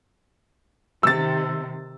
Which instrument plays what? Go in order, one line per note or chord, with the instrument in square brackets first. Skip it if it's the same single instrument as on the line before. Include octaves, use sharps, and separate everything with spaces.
[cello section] C3 D#3 [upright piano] E6 A6